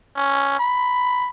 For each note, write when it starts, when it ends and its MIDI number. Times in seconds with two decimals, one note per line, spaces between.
0.16 0.58 61
0.59 1.30 83